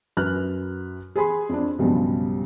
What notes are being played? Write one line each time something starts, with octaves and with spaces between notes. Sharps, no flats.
F#2 B4 F6 F#6
G#4 G#5 B5 C6
F2 D4
B1 G2 C#3 F3 G3